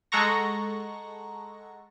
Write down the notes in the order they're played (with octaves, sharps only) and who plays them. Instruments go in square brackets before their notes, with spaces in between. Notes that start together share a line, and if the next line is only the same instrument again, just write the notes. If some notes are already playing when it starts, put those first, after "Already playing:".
[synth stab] G#3 A4 F#5 A#5 C#6 A#6